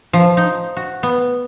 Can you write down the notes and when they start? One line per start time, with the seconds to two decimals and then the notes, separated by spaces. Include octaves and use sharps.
0.13 F3
0.37 D#4
0.77 F#4
1.03 B3